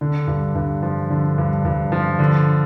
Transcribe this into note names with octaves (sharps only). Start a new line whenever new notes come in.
D3
G2
G2
F3
D3
G2
G2
F3
D3